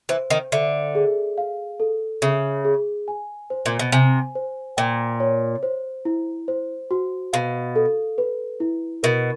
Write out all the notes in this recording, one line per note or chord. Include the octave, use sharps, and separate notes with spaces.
E3 C5
D#3
D3 E5
G#4
F5
A4
C#3 E5
G#4
G#5
C5
A#2
B2
C3 G#5
C5
A#2 G5
C#5
C5
E4
C5
F#4
B2 F5
A4
B4
E4
B2 A#4